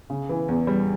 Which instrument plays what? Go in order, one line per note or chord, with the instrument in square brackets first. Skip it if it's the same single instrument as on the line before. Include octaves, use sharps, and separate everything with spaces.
[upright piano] C#3
E3
E2
G3